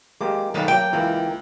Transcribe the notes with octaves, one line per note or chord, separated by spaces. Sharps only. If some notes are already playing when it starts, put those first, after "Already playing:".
G#3 A#3 G4 D6
B1 D#3 A#3 B4
F#3 G5
C#2 E3 A#3